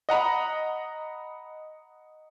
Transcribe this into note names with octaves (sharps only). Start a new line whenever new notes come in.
D#5 F#5 A#5 B5